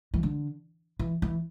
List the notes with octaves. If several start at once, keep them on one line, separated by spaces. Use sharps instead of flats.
E3
D3
E3
E3